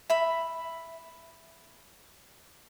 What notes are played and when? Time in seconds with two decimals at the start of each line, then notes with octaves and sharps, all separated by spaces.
0.10 E5 B5